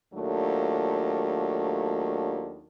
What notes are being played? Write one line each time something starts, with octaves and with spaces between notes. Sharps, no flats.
D#2 F#3 A3 D4 F4